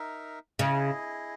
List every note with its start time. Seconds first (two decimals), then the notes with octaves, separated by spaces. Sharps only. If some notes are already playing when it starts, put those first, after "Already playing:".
Already playing: D#4 A#4 E5
0.59 C#3 E4 G#4 D#5